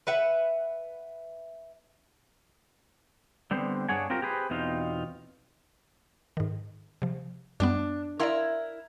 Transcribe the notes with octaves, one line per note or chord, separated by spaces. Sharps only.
B4 E5 F#5
D3 G3 B3 C4 C5
G2 D4 G#4 C#5 F#5 G#5
C4 F4 G4 A#4
G4 G#4 B4 C5
E2 B2 C4 D#4 F4
G#2 D#3
C3 F3
F#2 G3 B3 D4
E4 A#4 D5 F5 C6